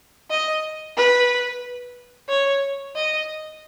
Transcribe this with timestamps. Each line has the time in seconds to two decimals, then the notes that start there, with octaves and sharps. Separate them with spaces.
0.30 D#5
0.97 B4
2.29 C#5
2.96 D#5